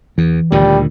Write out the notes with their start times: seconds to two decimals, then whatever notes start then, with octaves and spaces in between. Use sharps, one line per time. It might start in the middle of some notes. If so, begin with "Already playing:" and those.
0.18 E2 E3
0.52 D2 A#2 D#3 G3